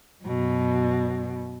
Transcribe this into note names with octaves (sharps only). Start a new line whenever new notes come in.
F#2 B2